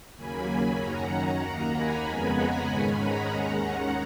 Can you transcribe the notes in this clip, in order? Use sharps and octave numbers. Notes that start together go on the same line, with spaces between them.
D#2 C#3 F#3 A#3 G#5 B5
G#5 B5
F#2 D#3 F#3 C#4 F#5 A#5
D#2 D#3 A#3
G#5 B5
F2 C#3 G#3 B3
F#5 A#5
G#2 D#3 G#3 C#4 G#5 B5
F#5 A#5
D#2 D#3 G#3 C#4